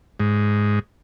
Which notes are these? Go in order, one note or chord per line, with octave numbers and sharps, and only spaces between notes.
G#2